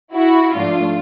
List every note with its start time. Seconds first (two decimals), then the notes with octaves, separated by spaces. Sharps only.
0.14 E4 F#4
0.54 G#2 F3 A3 D4 F4